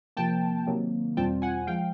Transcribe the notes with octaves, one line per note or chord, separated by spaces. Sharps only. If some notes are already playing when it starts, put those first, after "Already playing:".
C3 F3 A#3 G5 A5
C3 D#3 F#3 A#3
E2 B2 G3 C4 F4 G5 A5
F#5 G#5
F3 G#3 F5 G5